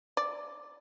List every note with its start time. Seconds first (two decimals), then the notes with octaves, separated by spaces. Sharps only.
0.17 D5